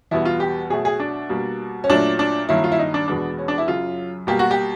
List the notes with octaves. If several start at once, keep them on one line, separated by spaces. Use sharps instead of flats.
E2 B2 G3 B3 E4
F4
G4
B2 F#3 A3 G#4
G#4
D4
B2 G3 A#3
C#4
A#2 F#3 A3 D4
D4
G2 D#3 F#3 A#3 E4
F4
E4
D#4
D4
E2 B2 G#3 B3 D4
C#4
D4
E4
F#2 C#3 F#3 F4
B2 G3 A#3 G4
F#4
G4